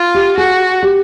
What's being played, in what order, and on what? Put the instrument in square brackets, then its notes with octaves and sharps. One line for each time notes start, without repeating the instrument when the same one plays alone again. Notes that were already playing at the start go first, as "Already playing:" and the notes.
Already playing: [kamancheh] F4
[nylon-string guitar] G4
[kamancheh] F#4 [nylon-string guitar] G#4
[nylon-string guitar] G4